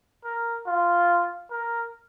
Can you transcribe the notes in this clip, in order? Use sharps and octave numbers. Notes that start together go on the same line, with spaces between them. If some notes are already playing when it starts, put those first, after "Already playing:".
A#4
F4
A#4